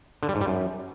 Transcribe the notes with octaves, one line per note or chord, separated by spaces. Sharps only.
D3
G3
G#2
G3
F#2